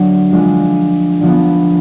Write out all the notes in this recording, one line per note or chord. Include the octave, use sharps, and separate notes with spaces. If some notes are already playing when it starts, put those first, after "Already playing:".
Already playing: D3 F#3 A#3 D4
F3 G#3 D4 F4
D3 F3 B3